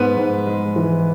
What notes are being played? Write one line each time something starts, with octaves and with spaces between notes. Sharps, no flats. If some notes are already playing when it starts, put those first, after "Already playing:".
Already playing: G#2 B3 B4
G#2
G#3
E3